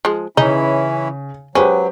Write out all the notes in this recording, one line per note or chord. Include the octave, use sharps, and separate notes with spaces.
F3 G#3
C#3 E3 C#4 D#4 E4
F#3 G#3 C#4 G4 B4 C5